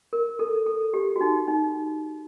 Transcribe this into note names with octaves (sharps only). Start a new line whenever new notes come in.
A#4
A4
A4
G4
F#4
D#4
D#4